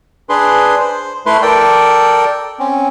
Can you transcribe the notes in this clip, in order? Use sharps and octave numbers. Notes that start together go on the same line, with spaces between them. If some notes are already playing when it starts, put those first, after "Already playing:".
D4 G#4 B4 C6
C5
A3 E4 B4 C6
A4 A#4 D5 G5
C4 C#4